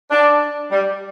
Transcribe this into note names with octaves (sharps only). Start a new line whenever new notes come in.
D4
G3